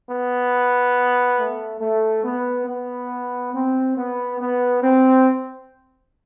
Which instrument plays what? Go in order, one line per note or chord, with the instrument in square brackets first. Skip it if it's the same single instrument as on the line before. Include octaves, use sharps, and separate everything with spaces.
[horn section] B3
A3
A3
B3
B3
C4
B3
B3
C4